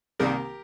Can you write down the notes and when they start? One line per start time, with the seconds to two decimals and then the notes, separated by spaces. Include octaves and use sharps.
0.19 C2 C3 D#3 G3 A#3 G4 A#4